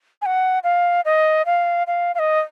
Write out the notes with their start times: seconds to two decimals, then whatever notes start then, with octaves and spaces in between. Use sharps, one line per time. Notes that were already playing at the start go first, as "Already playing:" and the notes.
0.22 G#5
0.26 F#5
0.64 F5
1.05 D#5
1.46 F5
1.87 F5
2.15 F5
2.19 D#5